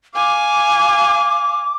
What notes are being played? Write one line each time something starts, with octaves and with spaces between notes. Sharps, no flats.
F5 G#5 D6